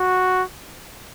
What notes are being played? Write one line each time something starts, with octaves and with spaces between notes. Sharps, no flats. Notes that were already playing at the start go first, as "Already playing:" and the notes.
Already playing: F#4